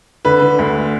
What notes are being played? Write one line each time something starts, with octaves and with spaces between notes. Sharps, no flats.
D3 B4
D3
D2